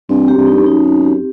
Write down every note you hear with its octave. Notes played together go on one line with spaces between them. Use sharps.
G2 C4
F#2 G4
G2
D#4
F#2 D#4
C4
G4